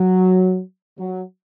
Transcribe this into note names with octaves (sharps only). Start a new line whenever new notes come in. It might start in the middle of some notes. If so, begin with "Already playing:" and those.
Already playing: F#3
F#3